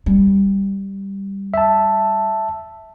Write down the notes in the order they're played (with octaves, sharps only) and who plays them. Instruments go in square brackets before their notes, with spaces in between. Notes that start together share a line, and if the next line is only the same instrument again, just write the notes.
[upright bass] G3
[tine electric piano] E5 A5